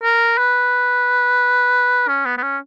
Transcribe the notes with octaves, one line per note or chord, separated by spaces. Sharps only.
A#4
B4
C#4
B3
B3
C#4